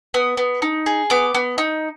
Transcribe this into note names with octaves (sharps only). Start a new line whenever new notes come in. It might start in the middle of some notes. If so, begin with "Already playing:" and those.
B3 D#6
B3
D#4
G#4
B3 D6
B3
D#4